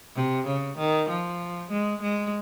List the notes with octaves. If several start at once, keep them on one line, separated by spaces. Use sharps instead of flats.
C3
C#3
D#3
F3
G#3
G#3